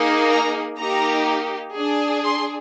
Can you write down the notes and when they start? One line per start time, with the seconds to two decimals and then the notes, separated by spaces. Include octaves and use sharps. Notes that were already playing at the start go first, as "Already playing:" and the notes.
Already playing: A#3 D#4 G#4
0.30 A#5
0.79 A#3 D#4 G4 A#5
1.75 D4 G#4
2.24 C6